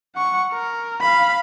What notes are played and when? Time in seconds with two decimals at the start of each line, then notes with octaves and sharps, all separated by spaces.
0.16 F#5 C#6
0.53 A#4
1.01 F5 B5